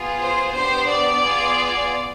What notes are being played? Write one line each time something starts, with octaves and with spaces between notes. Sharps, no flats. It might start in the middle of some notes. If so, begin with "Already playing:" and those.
Already playing: B3 F4 G#4
C5
B3 D4 G4 C5
D5
B3 F4 G#4